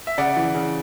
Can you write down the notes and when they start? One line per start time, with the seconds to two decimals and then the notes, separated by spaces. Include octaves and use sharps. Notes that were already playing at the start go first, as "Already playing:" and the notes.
0.07 E5
0.18 C#3 D5 F#5
0.36 E3
0.54 C#3